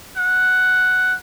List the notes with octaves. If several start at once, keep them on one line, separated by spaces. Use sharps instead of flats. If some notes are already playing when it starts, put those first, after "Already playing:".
F#5